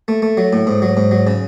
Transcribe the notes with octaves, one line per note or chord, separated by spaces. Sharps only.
A3
A3
F#3
A2
G#2
F#3
G#2
F#3
C#3